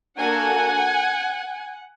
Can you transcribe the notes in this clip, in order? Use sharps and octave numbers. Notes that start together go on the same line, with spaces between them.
A#3 D4 F#4 A4 F#5 G#5